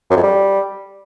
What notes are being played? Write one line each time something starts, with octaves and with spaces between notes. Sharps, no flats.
F#2
F2
G3